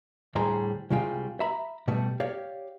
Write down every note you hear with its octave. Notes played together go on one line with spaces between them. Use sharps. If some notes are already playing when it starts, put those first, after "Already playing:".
D2 A2 G3 G#4 C5 A#5
C2 C3 G3 G#3 F4 G5
E5 A#5 B5
B2 G3 A3
G4 C#5 D5 F5